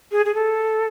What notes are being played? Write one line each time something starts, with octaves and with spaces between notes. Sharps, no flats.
G#4
G#4
A4